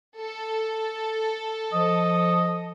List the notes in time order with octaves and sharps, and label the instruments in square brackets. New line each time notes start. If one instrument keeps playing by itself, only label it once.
[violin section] A4
[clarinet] F3 [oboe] D#5